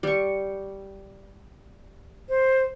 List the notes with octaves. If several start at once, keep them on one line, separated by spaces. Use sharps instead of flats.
G3 C#6
C5